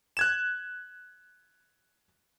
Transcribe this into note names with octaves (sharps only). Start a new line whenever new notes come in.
F#6 G#6 E7